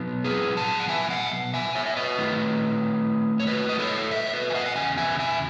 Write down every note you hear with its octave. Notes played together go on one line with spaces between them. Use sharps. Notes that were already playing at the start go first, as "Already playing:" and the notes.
Already playing: B2 F#3 B3
G#4 B4
F#5 A5
F#5
E5 G#5
D#5 F#5
E5 G#5
C#5 E5
E5
B4 D#5
D#3 A3 E4
C#5
B4 D#5
D#5
A4 C#5
C#5 E5
C#5
B4 D#5
G#5
D#5 F#5
F#5
E2 C#3 G#5
E5 G#5
E5 G#5